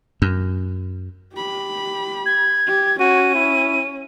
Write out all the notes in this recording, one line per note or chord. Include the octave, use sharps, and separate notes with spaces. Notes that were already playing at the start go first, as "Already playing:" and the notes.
F#2
G4 B5
G#6
G4
C#4 F#4 D#7
E4